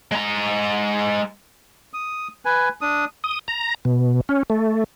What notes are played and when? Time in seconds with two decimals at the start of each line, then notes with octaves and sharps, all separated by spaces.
0.12 G#3 A#5
1.93 D#6
2.45 B4 G#5
2.81 D4 D#6
3.24 D#6
3.48 A#5
3.85 B2
4.29 C#4
4.50 A3